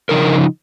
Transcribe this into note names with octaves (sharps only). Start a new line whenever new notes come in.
C#3 F3 D#4 A#4